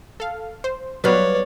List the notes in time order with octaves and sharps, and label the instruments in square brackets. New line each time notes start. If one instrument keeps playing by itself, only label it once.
[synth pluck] A4 F5
C5
[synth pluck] F#3 G3 B3 [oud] B4 F5 [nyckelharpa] C#5 D5